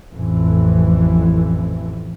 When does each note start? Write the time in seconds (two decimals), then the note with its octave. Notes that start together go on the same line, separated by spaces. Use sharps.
0.12 A1 F2 E3